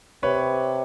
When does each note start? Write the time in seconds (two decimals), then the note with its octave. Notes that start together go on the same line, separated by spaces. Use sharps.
0.23 C3 B4 C#5